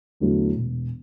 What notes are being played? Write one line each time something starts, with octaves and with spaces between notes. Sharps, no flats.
E2 D3 F#3 A3
E1